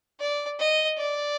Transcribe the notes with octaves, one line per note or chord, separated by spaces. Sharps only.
D5
D#5
D5